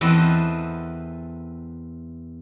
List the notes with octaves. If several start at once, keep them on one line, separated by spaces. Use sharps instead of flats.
E2 C4 A4 B4 D#5